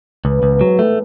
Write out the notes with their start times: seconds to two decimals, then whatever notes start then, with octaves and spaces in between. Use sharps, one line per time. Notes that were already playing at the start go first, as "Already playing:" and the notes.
0.25 C#2 E3
0.39 C#2 C#3
0.52 B2
0.61 G#2 F#3
0.79 A2 A3